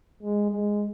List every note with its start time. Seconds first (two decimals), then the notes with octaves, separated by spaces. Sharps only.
0.23 G#3
0.52 G#3